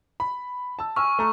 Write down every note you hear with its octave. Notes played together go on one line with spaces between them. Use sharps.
B5
A5 E6
G#5 C#6 E6 F6
A3 A#5